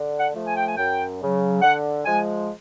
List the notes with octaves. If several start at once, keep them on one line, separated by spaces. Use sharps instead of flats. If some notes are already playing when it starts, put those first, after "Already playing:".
Already playing: D3
F#5
F3 A3
G#5
G5
G#5
F#2 G5
C#3 F#3
D3 F#5
F3 G#3 G#5